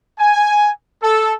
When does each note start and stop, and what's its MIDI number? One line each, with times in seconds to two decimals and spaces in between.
0.19 0.70 80
1.02 1.33 69